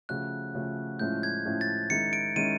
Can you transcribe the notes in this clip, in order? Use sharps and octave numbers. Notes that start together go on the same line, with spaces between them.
C#3 F3 A3 C#4 F#4 F#6
C#3 F3 A3 C#4 F#4
A2 F3 G#3 C#4 E4 G6
G#6
A2 F3 G#3 C#4 E4
A6
D#3 G#3 C#4 E4 C#7
D7
D#3 G#3 C#4 E4 D#7